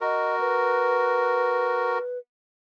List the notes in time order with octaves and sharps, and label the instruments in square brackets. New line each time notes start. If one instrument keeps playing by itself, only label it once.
[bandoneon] F#4 A#4 [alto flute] D#5
[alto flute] B4